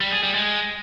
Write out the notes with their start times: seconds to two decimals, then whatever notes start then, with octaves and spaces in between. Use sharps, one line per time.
0.01 G3
0.12 G#4
0.23 G3
0.34 G#3